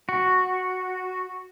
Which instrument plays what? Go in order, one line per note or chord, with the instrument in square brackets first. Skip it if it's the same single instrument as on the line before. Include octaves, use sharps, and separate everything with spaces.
[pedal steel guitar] F#4